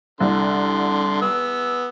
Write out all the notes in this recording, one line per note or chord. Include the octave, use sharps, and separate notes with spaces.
C2 D3 C6
B3 E6